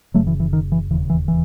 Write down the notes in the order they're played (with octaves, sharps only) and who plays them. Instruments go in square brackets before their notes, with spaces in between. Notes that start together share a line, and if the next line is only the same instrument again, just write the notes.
[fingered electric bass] F#1 F#2 C#3 F#3 A3
E3
E3
D#3
E3
E1 D#2 C#3 E3
E3
E3